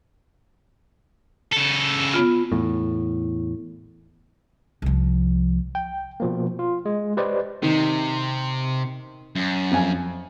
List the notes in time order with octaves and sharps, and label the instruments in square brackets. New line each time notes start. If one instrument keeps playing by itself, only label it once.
[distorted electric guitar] C#3 A4
[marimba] B3 F4
[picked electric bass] E2 A2
[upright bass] C2 F3
[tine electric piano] G5
B2 F3 A#3
F4
G#3
G4 B4 C5 D5 D#5
[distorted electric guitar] C3 [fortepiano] D#3
[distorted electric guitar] F#2
[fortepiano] F2 G#5